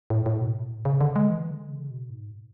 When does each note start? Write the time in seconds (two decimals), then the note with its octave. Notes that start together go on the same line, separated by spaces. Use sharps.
0.10 A2
0.26 A2
0.41 B2
0.56 A2
0.85 C#3
1.01 D3
1.16 G#3
1.30 E3
1.51 D3
1.70 C#3
1.90 B2
2.10 G#2